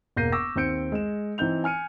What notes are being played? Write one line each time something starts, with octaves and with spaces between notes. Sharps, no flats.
E1 A#3 G6 A#6 C7 D#7
C#6 D6 E6 A#6
D#2 C4 C5 G6 C#7 D7
G#3 E7
E3 C4 D#4 G6 F7
G#5 F6 C#7 D#7